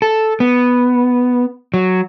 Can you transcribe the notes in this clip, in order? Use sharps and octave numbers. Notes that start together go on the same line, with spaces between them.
A4
B3
F#3